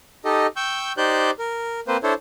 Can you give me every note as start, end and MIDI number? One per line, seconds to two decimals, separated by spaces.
0.25 0.47 63
0.25 0.47 67
0.25 0.47 69
0.25 0.47 75
0.56 0.92 79
0.56 0.92 85
0.56 0.92 88
0.56 0.92 91
0.97 1.31 63
0.97 1.31 67
0.97 1.31 72
0.97 1.31 74
0.97 1.31 90
0.97 1.31 91
1.39 1.80 70
1.88 1.97 58
1.88 1.97 60
1.88 1.97 71
1.88 1.97 72
2.03 2.14 62
2.03 2.14 64
2.03 2.14 69
2.03 2.14 72
2.03 2.14 73